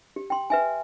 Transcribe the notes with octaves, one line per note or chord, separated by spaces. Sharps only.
G4
G5 C6
B4 E5 G#5